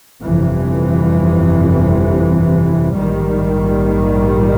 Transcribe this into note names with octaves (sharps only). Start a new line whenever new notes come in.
G1 F2 C3 E3
A#1 G#2 D#3 G3